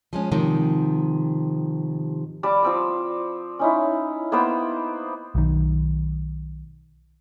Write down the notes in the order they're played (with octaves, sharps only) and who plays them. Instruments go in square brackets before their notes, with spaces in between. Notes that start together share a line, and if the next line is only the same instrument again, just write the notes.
[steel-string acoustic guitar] F3 G#3 C#4
G#2 C3 D#3 F3
[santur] G3 D5 A5 D6
F3 C4 E6
C#4 D#4 E4
A#3 B3 C5 G5
[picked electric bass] B1 D#3